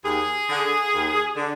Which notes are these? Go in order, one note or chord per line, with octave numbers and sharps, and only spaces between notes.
D#2 G#4
D3
D#2
D3